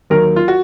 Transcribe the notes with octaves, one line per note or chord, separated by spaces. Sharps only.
D#2 D#3 F#3 A#4
F4
F#4